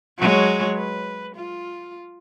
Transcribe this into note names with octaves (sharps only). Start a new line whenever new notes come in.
F#3 G#3 C#5
B4
F4